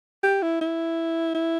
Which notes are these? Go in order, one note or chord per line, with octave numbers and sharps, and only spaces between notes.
G4
E4
E4
E4